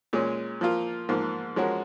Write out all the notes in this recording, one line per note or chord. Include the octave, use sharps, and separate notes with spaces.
A#2 G#3 C#4
F3 A#3 F4
G#2 F3 A#3
F3 G#3 C#4 F#4 A#4